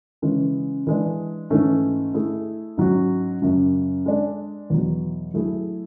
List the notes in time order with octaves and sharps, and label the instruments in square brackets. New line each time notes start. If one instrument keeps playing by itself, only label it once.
[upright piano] C#3 E3 G#3 C#4
E3 G#3 D4
G#2 E3 A3 C#4
A3 E4 G#4
G#2 F#3 C#4 F#4
F#2 C#3 F#3
G#3 D4 A4
E2 B2 F#3
F#3 A3 E4 G#4